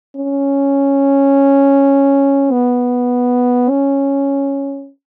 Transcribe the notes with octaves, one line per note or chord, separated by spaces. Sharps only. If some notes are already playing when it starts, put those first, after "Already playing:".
C#4
B3
C#4